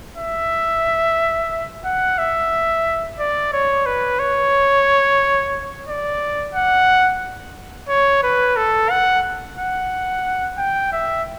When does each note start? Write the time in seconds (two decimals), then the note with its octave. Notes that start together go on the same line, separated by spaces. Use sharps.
0.17 E5
1.85 F#5
2.18 E5
3.19 D5
3.53 C#5
3.86 B4
4.19 C#5
5.88 D5
6.54 F#5
7.89 C#5
8.23 B4
8.56 A4
8.90 F#5
9.58 F#5
10.58 G5
10.92 E5